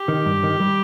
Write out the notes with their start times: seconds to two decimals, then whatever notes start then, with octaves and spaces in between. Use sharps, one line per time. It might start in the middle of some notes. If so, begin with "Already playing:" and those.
Already playing: G4
0.08 D#3
0.26 G2
0.43 D#3
0.60 G3